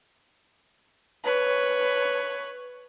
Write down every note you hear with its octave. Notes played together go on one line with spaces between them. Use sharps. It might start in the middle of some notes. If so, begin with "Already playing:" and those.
B4 C#5